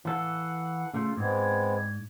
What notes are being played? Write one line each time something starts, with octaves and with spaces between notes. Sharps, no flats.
E3 A4 F5 F#5
C#3 A3 F4 C6
G#2 G#3 B3 C4 D4 G#6